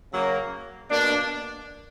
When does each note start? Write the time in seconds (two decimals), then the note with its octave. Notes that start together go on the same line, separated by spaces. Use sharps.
0.12 C#3 F#3 A#3
0.89 B2 A#3 D4